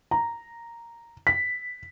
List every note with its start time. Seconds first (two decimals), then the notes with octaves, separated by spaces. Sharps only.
0.11 A#5
1.27 B6